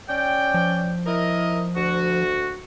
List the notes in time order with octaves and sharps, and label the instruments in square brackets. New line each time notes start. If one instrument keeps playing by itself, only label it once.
[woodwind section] C#4 D5 G5
[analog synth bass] F3
[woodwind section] E4 A#4 D#5
D2 F#4